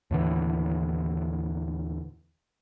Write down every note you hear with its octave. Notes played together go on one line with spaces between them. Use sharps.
D#2 A2 D3 E3